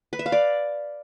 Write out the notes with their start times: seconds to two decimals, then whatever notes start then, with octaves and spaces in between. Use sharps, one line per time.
0.13 B4
0.19 E5
0.26 F5
0.32 D5